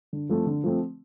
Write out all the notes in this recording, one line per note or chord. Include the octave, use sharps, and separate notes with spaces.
D3
F3 A3 C4
D3
F3 A3 C4